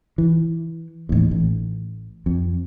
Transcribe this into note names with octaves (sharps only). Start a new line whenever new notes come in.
E3
A1 D#2
A1
F2